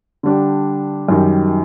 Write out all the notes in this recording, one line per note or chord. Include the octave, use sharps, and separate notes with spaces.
D3 G3 D4 G4
F#2 D#3 G3